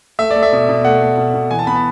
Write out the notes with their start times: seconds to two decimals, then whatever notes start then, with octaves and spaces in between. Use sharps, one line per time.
0.19 A3 E5
0.31 D5
0.36 A3
0.43 E5
0.52 B2
0.69 B2
0.85 A3 F#5
1.01 A3
1.17 B2
1.34 B2
1.51 E3 G#5
1.59 A5
1.67 B3 B5
1.75 A5